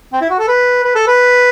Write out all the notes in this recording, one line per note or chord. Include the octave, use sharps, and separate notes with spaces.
C4
E4
F#4
A4
B4
B4
A4
B4